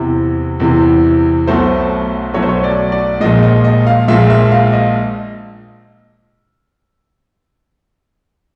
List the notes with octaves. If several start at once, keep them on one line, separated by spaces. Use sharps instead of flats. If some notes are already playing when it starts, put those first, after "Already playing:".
Already playing: E2 C3 E3
E2 C3 E3
B1 B2 F#3 A3 C5
B1 B2 F#3 A3 C#5
C5
C#5
D5
D5
A#1 A#2 F3 G#3 D#5
D#5
D#5
F5
A#1 A#2 F3 G#3 E5
E5
F5
D#5